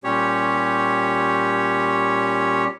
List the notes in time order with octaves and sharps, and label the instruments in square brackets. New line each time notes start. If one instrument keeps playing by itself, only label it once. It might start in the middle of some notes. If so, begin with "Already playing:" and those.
[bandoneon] A#2 G3 C#4 G4 C#5